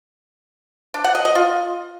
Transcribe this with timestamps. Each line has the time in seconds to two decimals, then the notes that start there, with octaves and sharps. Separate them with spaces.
0.94 D4
1.04 F#5
1.15 D#5
1.25 D#5
1.35 F4